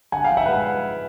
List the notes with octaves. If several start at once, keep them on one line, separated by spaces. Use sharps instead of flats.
D3 F#5 G#5
F5 G5
F3
E5 F#5
G#3 B4